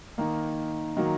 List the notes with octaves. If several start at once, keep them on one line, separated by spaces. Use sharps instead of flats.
D#3 A#3 D#4
D#3 F#3 A#3